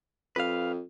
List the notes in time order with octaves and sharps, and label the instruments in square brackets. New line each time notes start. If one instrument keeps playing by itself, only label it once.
[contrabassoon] F2 [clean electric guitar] B4 F5